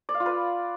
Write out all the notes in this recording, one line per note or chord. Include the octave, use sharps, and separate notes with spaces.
D5
F5
F4
B4